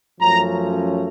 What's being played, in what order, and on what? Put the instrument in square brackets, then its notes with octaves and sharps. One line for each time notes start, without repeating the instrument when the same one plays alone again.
[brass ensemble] F#2 F3 A3 C#4 A#5